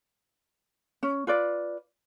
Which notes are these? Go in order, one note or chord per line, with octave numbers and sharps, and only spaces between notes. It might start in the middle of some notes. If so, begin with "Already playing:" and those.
C#4
F4 B4 D5